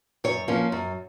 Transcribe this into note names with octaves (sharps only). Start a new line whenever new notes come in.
F#2 C#5
F3 A#3 C#4
F#2